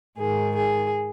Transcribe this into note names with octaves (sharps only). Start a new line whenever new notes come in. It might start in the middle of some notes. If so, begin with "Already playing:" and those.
G#2 D#3 G#4
G#4